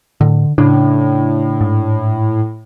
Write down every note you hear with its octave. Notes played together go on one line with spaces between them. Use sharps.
A2 D3
A2 C#3 D4
G#2